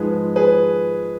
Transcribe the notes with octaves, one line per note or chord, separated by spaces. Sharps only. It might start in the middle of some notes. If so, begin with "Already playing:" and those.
Already playing: G#2 F3 G#3 G#4 B4
G#4 B4